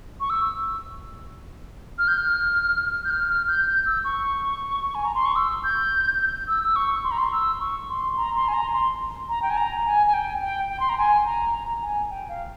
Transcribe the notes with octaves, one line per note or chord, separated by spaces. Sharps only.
C#6
E6
F6
G6
F6
G6
F6
F6
G6
G6
E6
C#6
G#5
A#5
C6
C#6
E6
G6
E6
E6
C#6
C6
A#5
C6
E6
C#6
C6
A#5
C6
G#5
A#5
C6
A#5
G5
G#5
A#5
G#5
G#5
G5
G5
G5
C6
A#5
G#5
A#5
A#5
G#5
G5
F5